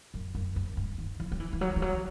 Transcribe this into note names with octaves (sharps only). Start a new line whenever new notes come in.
F#2
F#2
F#2
G2
D#3
E3
F#3
E3
E3
F#3
E3
F#3